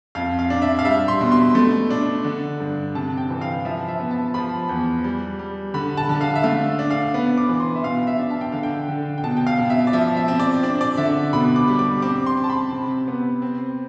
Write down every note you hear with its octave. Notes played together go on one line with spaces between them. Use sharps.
F2 F5
F5
D4
E5
F5
G3 E5
C6
B2
C6
A3
D4
D3
G2
C3 A5
G5
E3
F5
F3 E5
E5
B3
A5
F3 B5
E2
G3
G3
D3 B5
A5
D3
F5
E5
A3 F5
D4
F5
B3
D6
E3
C6
E5
B2 F5
E5
D4
A5
G5
D3 F5
G5
D3
G5
B2 A5
G5
F5
B2
E5
D5
F3 E5
E5
C4
D5
D4 D5
D5
D3 E5
B2 B5
D6
G3
D6
C4 D6
C6
C4
A5
B5
C3
B3
C4